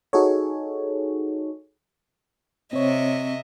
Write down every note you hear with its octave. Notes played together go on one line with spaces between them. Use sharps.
D#4 F#4 G#4 A4 C#5
C3 C4 C#5 D#5 E5